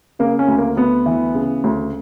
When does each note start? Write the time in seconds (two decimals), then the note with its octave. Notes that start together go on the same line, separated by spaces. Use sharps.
0.19 C#3 A#3
0.39 C#4
0.48 D2
0.58 A#3
0.77 D2 B3
1.06 E3
1.34 C#3
1.64 D2